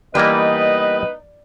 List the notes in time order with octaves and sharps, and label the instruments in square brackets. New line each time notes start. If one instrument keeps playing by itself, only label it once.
[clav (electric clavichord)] E3 A#3 D5 [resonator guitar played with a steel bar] G3 [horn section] B3 D#4 B4 [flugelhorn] D#5